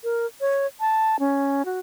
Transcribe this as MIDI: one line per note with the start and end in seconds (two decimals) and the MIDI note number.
0.04 0.26 70
0.41 0.66 73
0.80 1.16 81
1.19 1.65 61
1.65 1.79 66